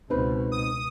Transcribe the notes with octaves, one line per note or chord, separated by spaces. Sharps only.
C#2 B2 C4 D#4 B4
D#6